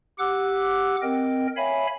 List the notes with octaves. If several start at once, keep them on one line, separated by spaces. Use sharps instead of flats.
G4 F#5 D6 E6 F#6
C4 A#4 D#5 G5
C#5 E5 F5 G#5 B5